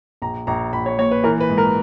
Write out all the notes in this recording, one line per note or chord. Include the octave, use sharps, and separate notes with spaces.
A#1 A#5
A#1 A#5
A#1 B5
C#5
A#2 C#5
B4
E3 A#4
B4
G#2
A#4